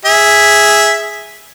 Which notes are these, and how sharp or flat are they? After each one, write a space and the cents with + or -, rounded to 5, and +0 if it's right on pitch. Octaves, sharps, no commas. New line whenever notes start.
G#4 +0 E5 +0